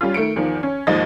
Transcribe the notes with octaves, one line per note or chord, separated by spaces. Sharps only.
G3 C#4 F4
D#3 A3 C#7 D7
E2 D#3 F3
C#4
D#2 G#2 F3 D#5 A6